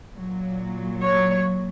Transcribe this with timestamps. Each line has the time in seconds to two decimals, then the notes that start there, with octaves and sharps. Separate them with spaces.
0.15 A#2 F#3
1.02 C#5